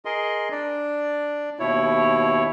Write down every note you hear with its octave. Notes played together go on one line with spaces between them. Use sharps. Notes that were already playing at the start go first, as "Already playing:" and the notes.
G#4 A#4 D#5 C6
D4 D5
D#2 B2 E4 C#5